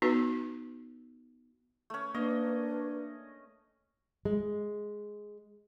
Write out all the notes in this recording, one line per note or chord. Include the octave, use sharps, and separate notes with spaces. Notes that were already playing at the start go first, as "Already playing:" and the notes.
B3 D#4 F#4 B4
A3 C#4
A#3 D4 B4 D#5
G#3